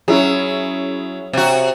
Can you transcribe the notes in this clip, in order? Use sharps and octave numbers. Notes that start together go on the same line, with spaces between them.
F#3 C#4 E4 G#4
C3 F#4